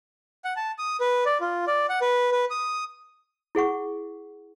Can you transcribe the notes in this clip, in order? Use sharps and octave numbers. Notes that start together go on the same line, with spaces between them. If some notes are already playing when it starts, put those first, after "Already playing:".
F#5
A5
D#6
B4
D5
F4
D5
F#5
B4
B4
D#6
E4 G#4 F#5 C#6